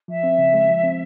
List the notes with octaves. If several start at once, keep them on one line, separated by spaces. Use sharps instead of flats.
F3 E5
C4
C#3
G#3
F3
C4